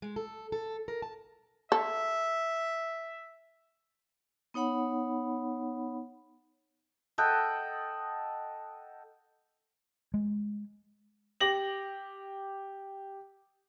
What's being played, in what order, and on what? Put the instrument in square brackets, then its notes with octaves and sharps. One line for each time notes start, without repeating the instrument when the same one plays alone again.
[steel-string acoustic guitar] G#3
A4
A4
A#4
A5
[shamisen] A4 [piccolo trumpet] E5
[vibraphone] B3 D#4 C#5 F#5 B5
[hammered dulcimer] A4 D#5 F#5 G5
[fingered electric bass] G#3
[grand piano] G4 A#6 F#7